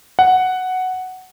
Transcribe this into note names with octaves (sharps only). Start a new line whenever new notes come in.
F#5